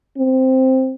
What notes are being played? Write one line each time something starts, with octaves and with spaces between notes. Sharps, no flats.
C4